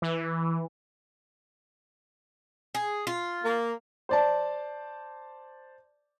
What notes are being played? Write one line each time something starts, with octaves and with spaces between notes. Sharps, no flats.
E3
G#4
F4
A#3
C5 D5 A5